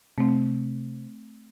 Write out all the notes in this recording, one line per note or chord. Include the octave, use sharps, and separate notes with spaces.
C3 A3 C4